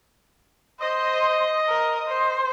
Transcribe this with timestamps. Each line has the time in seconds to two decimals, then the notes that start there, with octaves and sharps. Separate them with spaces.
0.81 C5 D#5
1.69 A#4
2.08 C5